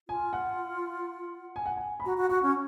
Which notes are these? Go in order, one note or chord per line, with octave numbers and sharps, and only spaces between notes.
F4 G#5
F#5
G#5
F#5
G#5
B5
F#4 A#5
F#4
F#4 C#6
C#4